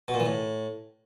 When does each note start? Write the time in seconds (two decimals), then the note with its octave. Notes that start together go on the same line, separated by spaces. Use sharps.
0.08 B2
0.14 A#2
0.20 E3
0.26 A2